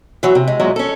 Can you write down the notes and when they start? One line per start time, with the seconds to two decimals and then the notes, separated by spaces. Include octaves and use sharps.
0.23 E3 F#3
0.35 C3
0.48 G#3
0.60 E2 A#2 F#3 G#3
0.76 C#4 A4